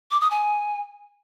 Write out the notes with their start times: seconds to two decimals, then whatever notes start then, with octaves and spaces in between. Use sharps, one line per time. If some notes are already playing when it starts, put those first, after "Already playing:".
0.11 D6
0.21 D#6
0.31 G#5